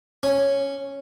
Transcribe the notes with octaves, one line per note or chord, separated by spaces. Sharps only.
C#4